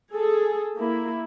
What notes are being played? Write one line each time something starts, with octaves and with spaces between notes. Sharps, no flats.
G#4 A4
A#3 E4